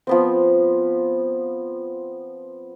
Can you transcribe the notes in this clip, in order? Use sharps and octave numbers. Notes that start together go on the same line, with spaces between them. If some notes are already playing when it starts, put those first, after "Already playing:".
F3 B3 C4